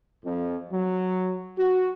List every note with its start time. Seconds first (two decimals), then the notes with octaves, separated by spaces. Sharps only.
0.25 F2
0.70 F#3
1.58 F#4